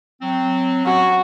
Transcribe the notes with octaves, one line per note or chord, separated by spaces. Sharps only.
F#3 C4
F#3 C#4 F#4